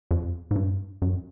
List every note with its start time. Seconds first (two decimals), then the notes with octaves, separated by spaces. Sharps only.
0.11 F2
0.51 G#2
0.56 G2
1.02 F#2